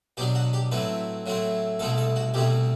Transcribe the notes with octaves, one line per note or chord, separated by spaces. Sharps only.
B2 F#3 B3 D4 G4
F#4
G4
A2 F#3 A3 C4 E4 B4
A2 F#3 A3 C4 E4
C2 B2 A3 C4 E4 A4
A4
F#4
C2 B2 A3 C4 E4 G4